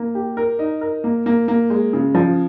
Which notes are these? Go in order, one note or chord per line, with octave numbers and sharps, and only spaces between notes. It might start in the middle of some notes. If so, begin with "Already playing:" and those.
Already playing: A#3
G4
A#4
D#4
A#4
A#3
A#3
A#3
G#3
C#3
F3